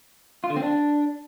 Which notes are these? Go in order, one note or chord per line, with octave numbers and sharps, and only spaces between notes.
F4
D3
C4
D4